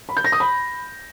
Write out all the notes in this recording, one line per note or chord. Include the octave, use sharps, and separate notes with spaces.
B5
G6
A#6
D#6
B5